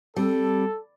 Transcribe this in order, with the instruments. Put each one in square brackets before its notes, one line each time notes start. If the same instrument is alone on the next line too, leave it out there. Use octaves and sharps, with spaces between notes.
[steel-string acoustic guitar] G3 [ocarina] C4 [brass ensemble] A4